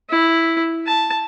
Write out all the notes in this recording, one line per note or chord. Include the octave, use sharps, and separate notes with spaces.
E4
A5